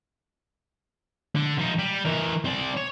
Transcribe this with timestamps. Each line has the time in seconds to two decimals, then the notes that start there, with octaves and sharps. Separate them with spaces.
1.35 D3
1.58 F3 D#4
1.79 G3
2.05 E3 A#4
2.44 C4 D5
2.77 C#5